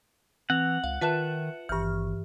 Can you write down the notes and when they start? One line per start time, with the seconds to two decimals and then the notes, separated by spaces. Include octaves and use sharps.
0.50 E3 C4 F#5 F7
0.84 C#2 F5
1.01 D#3 F4 B4 E5 A5 F#6 E7
1.69 G#1 G2 E3 C#6 F6